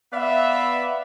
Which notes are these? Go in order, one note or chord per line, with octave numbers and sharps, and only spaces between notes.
B3 B4 D5 E5 F5 B5